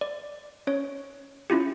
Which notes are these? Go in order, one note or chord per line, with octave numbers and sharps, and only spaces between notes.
D5
C#4 C#5
C#4 E4 F4 G4